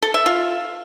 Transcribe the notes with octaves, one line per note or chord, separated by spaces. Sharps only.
A4
E5
F4